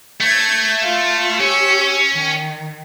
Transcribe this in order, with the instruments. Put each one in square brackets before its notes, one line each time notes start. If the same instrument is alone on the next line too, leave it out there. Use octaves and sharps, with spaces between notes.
[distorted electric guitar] A3 [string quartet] G6 G#6
[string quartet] F4 F5
[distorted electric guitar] C#4 [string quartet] G4 C#5 E6
[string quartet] D#3